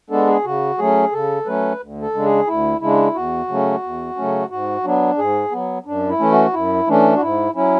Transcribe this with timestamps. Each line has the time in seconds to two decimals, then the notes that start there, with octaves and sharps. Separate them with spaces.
0.10 G#3 B3 D4 A4
0.27 G#4
0.45 C#3 F#4
0.78 F#3 A3 C#4 G#4
1.12 C#3 A4
1.46 F#3 A3 C#4 B4
1.80 D2
2.02 A4
2.14 C#3 G#3 D4
2.25 G#4
2.47 D2 E4
2.81 C#3 G#3 D4 E4
3.15 E2 F#4
3.48 C#3 F#3 A3 C#4
3.83 E2
4.16 C#3 F#3 A3 C#4
4.50 G#2 F#4
4.84 F#3 B3 D4
5.18 G#2 G#4
5.51 F#3 B3
5.86 F#2 D4
6.09 E4
6.20 E3 A3 C#4
6.31 F#4
6.53 F#2 E4
6.87 E3 A3 C#4 D4
7.16 F#4
7.21 G#2 E4
7.55 F#3 C#4 E4